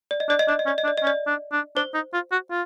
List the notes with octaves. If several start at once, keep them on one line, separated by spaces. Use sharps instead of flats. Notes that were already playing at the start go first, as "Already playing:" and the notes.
D5
D#5
D4 D5
D#5
D4 D5
D#5
C#4 D5
D#5
D4
D5
D#5
C#4
D5
D4
D4
D4 C5
D#4
F4
F#4
F4